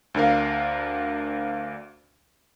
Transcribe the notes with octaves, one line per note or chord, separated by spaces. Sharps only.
D2 D4 A#4 F5